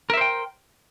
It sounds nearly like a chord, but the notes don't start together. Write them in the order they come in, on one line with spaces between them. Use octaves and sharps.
A#4 E5 C5 G5